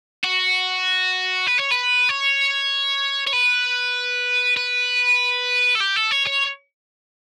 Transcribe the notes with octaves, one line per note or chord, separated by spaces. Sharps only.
F#4
B4
C#5
B4
C#5
C#5
B4
B4
A4
G4
A4
C#5
C#5